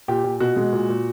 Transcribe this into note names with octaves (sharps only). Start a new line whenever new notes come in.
A#2 G4
A#2
B2 F#4
G#3
A#2
A#2